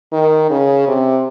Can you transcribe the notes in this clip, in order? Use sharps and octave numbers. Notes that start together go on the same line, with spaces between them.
D#3
C#3
C3